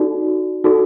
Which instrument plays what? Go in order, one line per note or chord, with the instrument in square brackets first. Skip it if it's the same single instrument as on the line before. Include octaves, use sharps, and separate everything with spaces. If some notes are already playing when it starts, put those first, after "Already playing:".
Already playing: [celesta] D#4 F#4 A4 D5
D#4 F#4 A4 D5